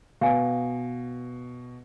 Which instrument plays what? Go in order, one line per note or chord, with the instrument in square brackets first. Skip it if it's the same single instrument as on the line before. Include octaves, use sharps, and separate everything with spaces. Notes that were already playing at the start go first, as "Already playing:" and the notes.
[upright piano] B2 [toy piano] F5 G#5